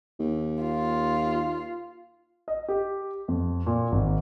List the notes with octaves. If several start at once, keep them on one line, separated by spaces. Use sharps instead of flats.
D#2
F4
D#5
G4
F2
A#2
G#1